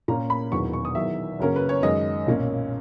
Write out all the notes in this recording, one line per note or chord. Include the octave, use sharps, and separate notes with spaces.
A#2 A#3 C#4 A#5
B5
E1 E2 D#3 F#3 C#6
C#6
D#6
E2 D#3 F#3 E5
F#2 C#3 F#3 A#3 C#4 A#4
B4
C#5
F#2 D#3 G#3 D#5
B1 A#2 A#3 C#4